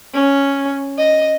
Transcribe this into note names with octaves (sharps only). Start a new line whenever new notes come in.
C#4
D#5